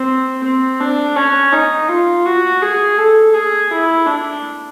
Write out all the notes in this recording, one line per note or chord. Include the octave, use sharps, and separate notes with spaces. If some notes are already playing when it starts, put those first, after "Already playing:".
Already playing: C4
C4
D4
C#4
D#4
F4
F#4
G#4
A4
G#4
E4
D4